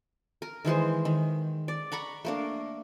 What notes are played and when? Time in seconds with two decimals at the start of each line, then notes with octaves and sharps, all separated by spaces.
0.42 A#4
0.65 D#3 E3 G#3 C5
1.05 D#3
1.68 D5
1.92 F#5 A#5 B5 C#6
2.25 A3 A#3 D4